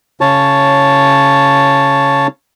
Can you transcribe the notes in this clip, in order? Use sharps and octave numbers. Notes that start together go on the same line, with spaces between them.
C#3 C#5 A5